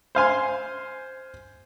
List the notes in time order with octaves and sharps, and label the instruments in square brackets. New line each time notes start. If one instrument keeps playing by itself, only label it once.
[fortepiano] C5 F5 G#5 C6